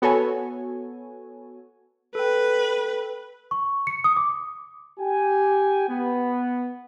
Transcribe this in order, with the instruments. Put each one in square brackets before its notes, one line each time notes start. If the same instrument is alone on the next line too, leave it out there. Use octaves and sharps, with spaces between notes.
[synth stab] B3 F#4 A4 C#5 G#5
[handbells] A4 G5 [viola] B4
[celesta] C#6
C#7
D#6
D6
[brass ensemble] G4 G5 G#5
B3